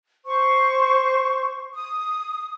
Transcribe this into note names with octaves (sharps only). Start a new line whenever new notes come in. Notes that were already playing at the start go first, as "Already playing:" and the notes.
C5 C#6
D#6